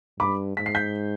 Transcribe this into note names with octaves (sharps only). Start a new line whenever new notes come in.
G2 B5 D6
G#2 B6
C7
G6 B6